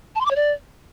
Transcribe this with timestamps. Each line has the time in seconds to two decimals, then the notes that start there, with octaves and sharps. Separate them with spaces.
0.15 A5
0.21 C6
0.26 D6
0.31 C#5
0.36 D5